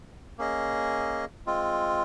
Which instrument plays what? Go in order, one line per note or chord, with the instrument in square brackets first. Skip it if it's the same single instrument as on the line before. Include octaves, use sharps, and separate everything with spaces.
[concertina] A#3 C#4 G#4 D#5
G#3 C4 F4